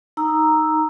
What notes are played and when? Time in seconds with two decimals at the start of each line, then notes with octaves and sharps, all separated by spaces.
0.17 D#4 A#5 E6